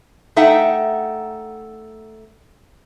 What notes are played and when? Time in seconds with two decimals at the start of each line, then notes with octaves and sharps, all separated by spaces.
0.36 A3 D#4 E5 F#5 G5